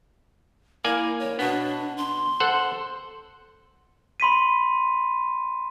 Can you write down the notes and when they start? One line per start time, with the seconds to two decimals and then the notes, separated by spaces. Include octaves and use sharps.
0.84 A#3 E4 D5 G#5
1.20 C#5
1.39 B2 B3 D4
1.97 C6
2.40 A4 C5 F#5
4.20 B5 C6 B6 D#7